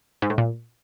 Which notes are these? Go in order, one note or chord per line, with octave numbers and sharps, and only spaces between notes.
G#2
A2
A#2